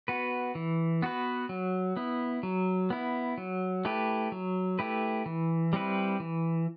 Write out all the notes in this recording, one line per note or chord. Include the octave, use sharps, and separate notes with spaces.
B3 F#4 B4
E3
B3 F#4 B4
F#3
B3 E4
F#3
B3 E4
F#3
A3 E4 G4 B4
F#3
A3 E4 G4 B4
E3
G3 C4 E4 B4
E3